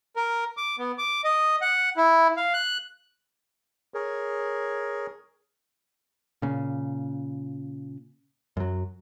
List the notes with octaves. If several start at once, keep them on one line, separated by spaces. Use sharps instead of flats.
A#4
D6
B3
D6
D#5
F#5
E4
F5
F#6
G#4 A#4 C#5
A#2 C#3
F#2 F#3